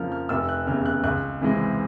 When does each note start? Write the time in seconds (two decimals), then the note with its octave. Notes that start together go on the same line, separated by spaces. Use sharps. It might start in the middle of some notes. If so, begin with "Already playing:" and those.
Already playing: F2 C#3 F3 A#3 F6
0.12 F6
0.29 F1 E6
0.49 F#6
0.67 E2 C#3 F6
0.86 F#6
1.04 C#2 F#6
1.42 C3 E3 G#3 C4